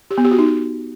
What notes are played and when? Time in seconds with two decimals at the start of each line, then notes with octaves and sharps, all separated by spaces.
0.11 G4
0.18 B3
0.25 G4
0.32 F#4
0.38 D#4